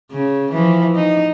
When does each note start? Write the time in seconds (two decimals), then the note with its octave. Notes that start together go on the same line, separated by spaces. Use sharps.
0.12 C#3
0.52 E3 F3
0.95 D#4